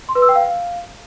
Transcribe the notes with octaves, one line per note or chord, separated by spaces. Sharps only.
C6
B4
E6
G5
F5